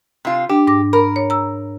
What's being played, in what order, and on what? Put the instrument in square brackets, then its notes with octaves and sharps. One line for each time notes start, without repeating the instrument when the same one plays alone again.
[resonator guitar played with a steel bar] C3 F4
[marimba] D4 [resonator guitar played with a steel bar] G4
[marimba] G#2 D6 A#6
[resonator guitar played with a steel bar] A#4 [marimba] B5
[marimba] C#5
A#5 E6